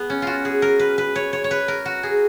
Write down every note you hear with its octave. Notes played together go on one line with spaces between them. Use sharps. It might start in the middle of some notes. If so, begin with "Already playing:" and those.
Already playing: B3 G#4
C#4
F4 F#4
G#4
A#4
B4
B4
C#5
C#5
C#5
B4
A#4
F#4
G#4